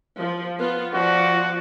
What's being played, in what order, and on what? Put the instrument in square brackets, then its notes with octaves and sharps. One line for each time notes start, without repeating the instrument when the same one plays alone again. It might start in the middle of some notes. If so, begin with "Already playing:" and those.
[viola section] F3
B3 F4
[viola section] F3 D5 [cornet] F#4